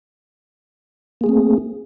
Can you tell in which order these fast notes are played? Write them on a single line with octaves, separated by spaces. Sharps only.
A#3 G#4 A3 C4